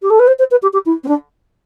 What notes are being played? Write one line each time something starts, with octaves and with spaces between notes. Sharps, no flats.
G4
A4
B4
C5
C5
B4
G4
G4
E4
C4
D4